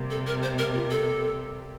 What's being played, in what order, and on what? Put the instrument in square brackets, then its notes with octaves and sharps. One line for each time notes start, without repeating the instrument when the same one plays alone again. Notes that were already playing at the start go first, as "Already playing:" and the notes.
Already playing: [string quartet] C3 G3 A#3
[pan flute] A4
A#4
C5
A#4
F4
A4